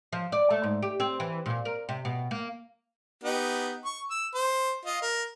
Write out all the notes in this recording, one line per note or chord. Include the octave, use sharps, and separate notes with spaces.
F3
D5
A3
G#2
G4
C4
E3
A#2
A#4
C3
B2
A#3
B3 D#4 G4
C#6
E6
C5
F4 D#5
A#4